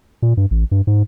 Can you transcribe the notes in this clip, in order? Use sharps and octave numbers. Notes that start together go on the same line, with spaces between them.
A#2
G2
A1
G2
G#2